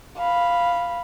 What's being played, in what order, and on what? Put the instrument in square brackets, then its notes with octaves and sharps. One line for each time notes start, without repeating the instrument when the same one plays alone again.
[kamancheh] F5 B5